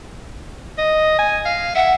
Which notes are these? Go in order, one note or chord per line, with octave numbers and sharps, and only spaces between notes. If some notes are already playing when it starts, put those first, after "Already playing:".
D#5
G#5
F5
E5 F#5